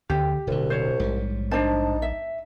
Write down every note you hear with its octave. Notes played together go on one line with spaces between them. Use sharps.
D2 D3 G4
D1 C2 B2 D3
C5 C#5
A#1 G#2 G3
D4 D#4 C5 A5
E5